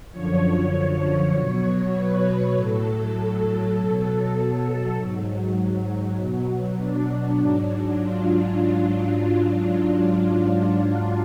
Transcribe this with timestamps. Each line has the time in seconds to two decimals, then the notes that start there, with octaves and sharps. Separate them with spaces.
0.12 F#2 D3 F3 C#5
1.33 B2 F#3
1.93 B4
2.54 A2 F#3 A4
3.75 B2 F#3 A4
4.96 G#2 F#3
6.17 B2 F#3
6.78 D4
7.38 G#2 F#3
7.98 F4
8.29 F4